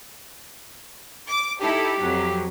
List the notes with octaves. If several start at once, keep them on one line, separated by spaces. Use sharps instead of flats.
D6
D#4 E4 G4 A4
F2 F#3